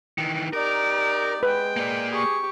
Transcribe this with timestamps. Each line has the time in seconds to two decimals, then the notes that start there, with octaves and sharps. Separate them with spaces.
0.18 D#3 E3
0.53 D#4 G4 A#4 D5
1.43 G#3 B4 G5
1.77 A#3 D5
2.12 G4 G#4 C#6